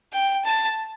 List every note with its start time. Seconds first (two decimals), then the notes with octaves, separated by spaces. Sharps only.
0.13 G5
0.45 A5